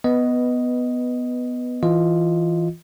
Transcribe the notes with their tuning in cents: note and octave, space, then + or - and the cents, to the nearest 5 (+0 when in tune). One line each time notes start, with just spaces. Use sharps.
B3 +5 B4 -5 D#5 +0
E3 +0 F4 +0 D#5 +0